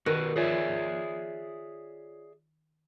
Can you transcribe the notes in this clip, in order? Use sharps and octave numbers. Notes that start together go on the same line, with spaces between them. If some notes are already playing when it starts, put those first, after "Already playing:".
D#3 F#4 A#4 B4 F#6
F4 G#4 C#5 D5 E5